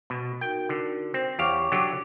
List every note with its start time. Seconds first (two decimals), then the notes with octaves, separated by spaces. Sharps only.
0.10 B2
0.41 D#4 F#4 A#4 G5
0.69 D3
1.14 C4 C5
1.39 E2 G4 C#5 F5 C#6 D6
1.72 D3 F#3 G4